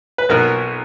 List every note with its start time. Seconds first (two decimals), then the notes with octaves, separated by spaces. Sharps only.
0.18 B4
0.29 B1 B2 F#3 A#4